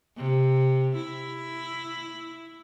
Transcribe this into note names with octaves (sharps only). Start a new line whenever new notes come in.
C3
E4